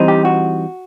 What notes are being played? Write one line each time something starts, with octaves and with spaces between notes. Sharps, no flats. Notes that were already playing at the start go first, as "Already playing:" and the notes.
Already playing: E3 G3 C4 D#4
G4
F#4